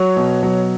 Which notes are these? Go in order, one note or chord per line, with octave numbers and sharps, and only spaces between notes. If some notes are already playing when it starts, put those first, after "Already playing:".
Already playing: F#3 C#5
B2
F#3